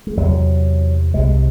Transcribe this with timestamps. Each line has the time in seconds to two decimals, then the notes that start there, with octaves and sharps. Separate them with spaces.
0.07 G#3
0.17 E2 C3 F#3
1.14 C2 C3 G#3